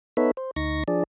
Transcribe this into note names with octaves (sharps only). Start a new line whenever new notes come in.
B3 D#4 A4 B4 C#5 E5
C5
D2 D#4 C#6 A#6
F3 D4 G#4 D5